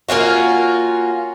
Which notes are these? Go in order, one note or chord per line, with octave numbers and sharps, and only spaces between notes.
A#3 C#4 F4 F#4